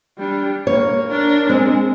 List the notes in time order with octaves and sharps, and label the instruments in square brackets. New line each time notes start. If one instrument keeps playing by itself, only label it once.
[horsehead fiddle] G3 D4
[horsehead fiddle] A#3 [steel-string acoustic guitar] C#5
[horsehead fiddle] D4 A#4
[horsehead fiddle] G#3 [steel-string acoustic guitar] C4